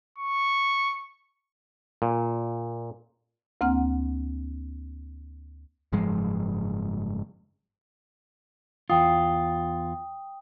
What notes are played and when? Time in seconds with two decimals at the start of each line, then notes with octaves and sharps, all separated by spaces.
0.18 C#6
2.02 A#2
3.61 D2 A#3 C4 F#5 F6
5.92 F#1 G#2 F3 G#3
8.90 E2 F4 G5 D#6